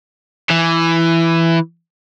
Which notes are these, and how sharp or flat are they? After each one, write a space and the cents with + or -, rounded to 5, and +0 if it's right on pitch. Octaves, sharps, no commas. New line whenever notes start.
E3 +10